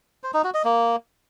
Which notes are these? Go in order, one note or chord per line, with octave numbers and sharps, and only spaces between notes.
C5
D#4
F#4
D#5
A#3